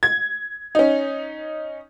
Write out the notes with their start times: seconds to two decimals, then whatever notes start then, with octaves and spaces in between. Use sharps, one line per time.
0.03 G#6
0.75 C#4 D#4